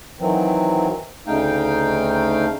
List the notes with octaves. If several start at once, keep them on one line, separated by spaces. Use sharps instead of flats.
D#3 E3 F#3 C4
D2 C#3 A3 D#4 F5 G5